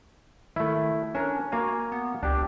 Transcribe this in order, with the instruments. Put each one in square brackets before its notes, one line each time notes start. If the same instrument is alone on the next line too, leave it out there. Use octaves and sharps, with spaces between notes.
[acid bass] D#3 [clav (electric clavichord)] A3 E4
[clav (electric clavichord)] C#4 A#4 [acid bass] D4
[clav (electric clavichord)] A#3 F5 G#5 [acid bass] F#4
[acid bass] B3
[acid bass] C#2 [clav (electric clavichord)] D4 G4